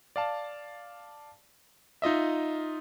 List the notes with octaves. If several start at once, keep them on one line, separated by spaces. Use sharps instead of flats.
D5 F5 A5
D#4 F4 D#5 E5